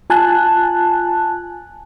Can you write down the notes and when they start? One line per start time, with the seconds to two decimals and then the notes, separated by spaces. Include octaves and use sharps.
0.10 F4 G#5 A5 F#6